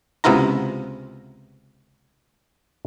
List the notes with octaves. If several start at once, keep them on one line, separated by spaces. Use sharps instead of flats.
C#2 C3 B3 E4 F4 A#5